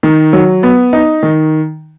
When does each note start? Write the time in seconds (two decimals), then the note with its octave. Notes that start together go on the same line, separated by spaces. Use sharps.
0.03 D#3
0.33 F#3
0.63 B3
0.93 D#4
1.23 D#3